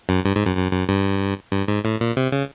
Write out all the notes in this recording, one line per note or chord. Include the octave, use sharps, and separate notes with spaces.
F#2
G2
G#2
F#2
F#2
F#2
G2
G2
G#2
A2
A#2
C3
C#3